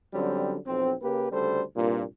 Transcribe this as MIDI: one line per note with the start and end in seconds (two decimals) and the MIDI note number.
0.13 0.57 50
0.13 0.57 54
0.13 0.57 55
0.13 0.57 60
0.13 0.57 61
0.67 0.93 35
0.67 0.93 41
0.67 0.93 60
1.02 1.29 49
1.02 1.29 58
1.02 1.29 67
1.02 1.29 71
1.32 1.62 38
1.32 1.62 49
1.32 1.62 55
1.32 1.62 69
1.32 1.62 72
1.76 2.03 36
1.76 2.03 43
1.76 2.03 46